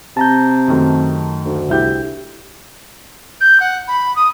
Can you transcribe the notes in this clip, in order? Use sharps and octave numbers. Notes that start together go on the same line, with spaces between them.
C3 A5 A#5 G6
F#2 D#3 A3
D2
C2 E4 G4 E5 G6
G6
F#5
B5
D#6